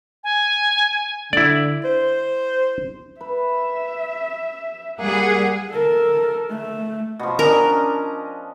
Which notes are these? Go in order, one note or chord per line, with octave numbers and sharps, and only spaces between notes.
G#5
D3 E4 D5
C5
B4 E5
G3 A#3 G#4 F#5
A4 A#4
A3
B2 F3
C#4 D4 A#4 D#5